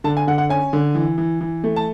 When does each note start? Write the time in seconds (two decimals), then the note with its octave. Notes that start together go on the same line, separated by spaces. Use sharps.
0.04 D3 A5
0.17 G#5
0.27 D3 F#5
0.38 F#5
0.49 C#4 G#5
0.73 D3
0.95 E3
1.18 E3
1.41 E3
1.64 A3
1.76 A5